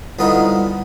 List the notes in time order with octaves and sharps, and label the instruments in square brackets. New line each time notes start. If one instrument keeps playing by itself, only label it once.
[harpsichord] C2 D3 B3 D#4 F4